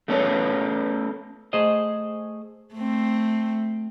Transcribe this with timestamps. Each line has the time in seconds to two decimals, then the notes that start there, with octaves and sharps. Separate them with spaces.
0.08 A3 B3 C#4 A4 B4 C#5
1.53 A3 G#4 C5 D#5
2.75 A3 C4